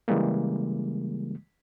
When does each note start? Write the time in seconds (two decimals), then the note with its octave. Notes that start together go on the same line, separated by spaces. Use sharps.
0.08 C#3 E3 G3 G#3 A#3